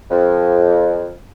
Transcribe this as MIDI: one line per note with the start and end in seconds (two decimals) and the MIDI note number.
0.11 1.10 41